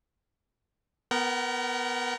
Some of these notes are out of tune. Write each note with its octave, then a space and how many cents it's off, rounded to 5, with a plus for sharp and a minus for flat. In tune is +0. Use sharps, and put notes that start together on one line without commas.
B3 +0 A#4 +0 F#5 +45